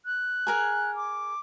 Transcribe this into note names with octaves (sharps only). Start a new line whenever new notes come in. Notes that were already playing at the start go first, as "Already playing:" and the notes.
F#6
G#4 A#4 G#5
D6